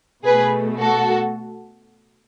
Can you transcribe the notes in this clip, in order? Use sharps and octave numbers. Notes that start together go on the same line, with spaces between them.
B2 A3 G#4 B4
F#4 A4